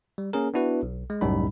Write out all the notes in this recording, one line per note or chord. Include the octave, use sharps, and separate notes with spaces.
G3
A#3 C#4 G#4 A#4
B3 D4 E4 F#4 B4
B1
G#3
C2 F#2 A2 G3 D#4 B5